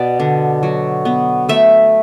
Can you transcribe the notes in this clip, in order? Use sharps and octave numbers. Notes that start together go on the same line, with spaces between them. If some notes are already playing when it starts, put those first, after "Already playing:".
Already playing: B2 B3 D5
D3
F#3
B3
A3 E5